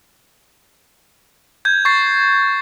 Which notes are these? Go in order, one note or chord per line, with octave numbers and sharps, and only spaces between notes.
G6 G#6
C#6 A6 C7